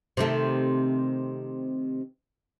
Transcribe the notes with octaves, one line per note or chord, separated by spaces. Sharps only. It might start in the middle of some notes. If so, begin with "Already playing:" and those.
C3 D#3 A3